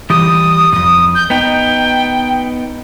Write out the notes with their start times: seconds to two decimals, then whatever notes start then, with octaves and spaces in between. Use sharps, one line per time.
0.10 E3 G3 G4 D#6
0.72 F2 G#2 D#6
1.15 G6
1.30 B3 D#4 G5